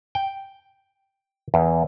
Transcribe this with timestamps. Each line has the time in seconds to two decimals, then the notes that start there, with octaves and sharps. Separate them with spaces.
0.15 G5
1.54 E2